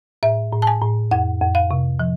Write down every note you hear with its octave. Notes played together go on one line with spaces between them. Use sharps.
A2 E5
A2
A5
G#5
A2
F2 F#5
F2
F5
C3
F3